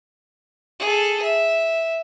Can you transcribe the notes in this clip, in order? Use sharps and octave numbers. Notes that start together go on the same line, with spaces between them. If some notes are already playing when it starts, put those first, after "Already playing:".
G#4 A4
E5